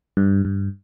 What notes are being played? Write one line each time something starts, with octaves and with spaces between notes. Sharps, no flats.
G2
G2